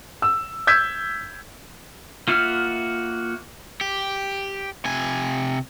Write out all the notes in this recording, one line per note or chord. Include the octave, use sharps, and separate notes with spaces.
E6
E6 G6 G#6 B6
A#3 F4 F#4 E5 F6
G4
C3 G#5